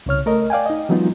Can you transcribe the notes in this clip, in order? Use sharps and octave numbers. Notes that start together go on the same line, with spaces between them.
C2 C#3 C#5 F6
A3 A#4 D#5
D5 F5 G5 G#5
D#4 D#5
E3 F#3 G#3 B3 D#4 F4